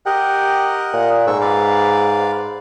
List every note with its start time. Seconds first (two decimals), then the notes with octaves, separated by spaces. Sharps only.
0.06 G4 A#4 D#5 F#5
0.93 A#2
1.27 G#2 A4 C#6 E6
1.41 B4 D5 F5